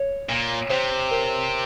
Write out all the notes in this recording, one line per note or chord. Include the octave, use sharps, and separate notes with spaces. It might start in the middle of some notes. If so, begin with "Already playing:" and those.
Already playing: C#5
A#2
C3 C5
A#4